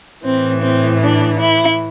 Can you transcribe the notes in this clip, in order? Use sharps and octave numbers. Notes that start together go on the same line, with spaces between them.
A2 E3 C4
C4
D4
E4